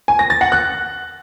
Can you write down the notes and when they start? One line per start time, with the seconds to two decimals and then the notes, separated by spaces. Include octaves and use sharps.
0.08 G#5
0.19 A#6
0.30 A6
0.41 F#5
0.52 F#6